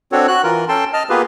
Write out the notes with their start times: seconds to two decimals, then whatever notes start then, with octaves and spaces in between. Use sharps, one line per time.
0.12 C4 D4 F#4 A4 C#5
0.28 F#4 F#6
0.44 E3 F4 A#4
0.68 C#4 A4 G5 A5 C6
0.93 D#5 A5 F6
1.10 A#3 B3 F4 G4 G#4 B4